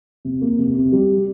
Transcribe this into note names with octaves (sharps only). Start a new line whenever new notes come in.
C3
A#3
C3
C3
G3